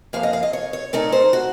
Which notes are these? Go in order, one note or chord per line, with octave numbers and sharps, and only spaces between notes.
F#2 F3 A#3 F5
D#5
F5
D#5
C#5
C#5
A#2 A3 D#4 A#4
C5
F#4